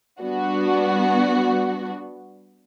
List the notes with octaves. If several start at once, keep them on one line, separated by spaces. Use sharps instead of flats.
G3 B3 D4 F#4